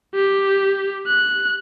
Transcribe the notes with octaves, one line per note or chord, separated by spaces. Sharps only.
G4
F#6